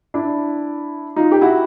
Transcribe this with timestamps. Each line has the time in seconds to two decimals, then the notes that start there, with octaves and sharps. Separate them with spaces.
0.14 D4 E4
1.16 D#4 F4
1.32 G4
1.41 E4 F#4